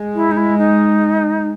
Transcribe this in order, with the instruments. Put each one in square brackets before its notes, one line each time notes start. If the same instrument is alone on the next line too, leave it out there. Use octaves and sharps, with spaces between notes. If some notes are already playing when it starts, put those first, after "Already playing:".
Already playing: [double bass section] G#3
[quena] E4
D#4
E4
D#4